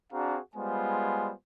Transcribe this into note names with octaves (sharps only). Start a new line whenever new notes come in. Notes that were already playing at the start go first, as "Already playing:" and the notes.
C4 D4 F#4 G#4 F5 A#5
G3 G#3 B3 F4 C5 G#5